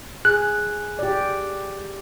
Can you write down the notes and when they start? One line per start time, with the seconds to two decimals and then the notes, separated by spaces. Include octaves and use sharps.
0.25 G#4 F#6
0.99 G4 D5